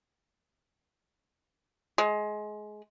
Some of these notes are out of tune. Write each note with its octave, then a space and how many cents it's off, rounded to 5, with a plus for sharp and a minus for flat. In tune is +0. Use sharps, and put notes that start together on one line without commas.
G#3 +20